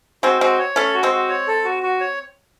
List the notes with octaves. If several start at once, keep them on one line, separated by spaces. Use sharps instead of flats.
G#3 C4 F#4
G#3 C4 F#4
C#5
A3 C#4 A4
F#4
G#3 C4
F#4
C#5
A4
F#4
F#4
C#5